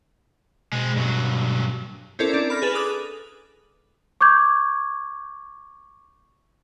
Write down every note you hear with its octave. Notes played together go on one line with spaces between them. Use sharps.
B2 G#3 C4
G2 F#3
C4 C#4 E4 A4 A#4 D5
D4
B5 F6 A#6
G#4 A4 B4 A6 F7
D6 D#6 F#6
C#6 D6 G6 G#6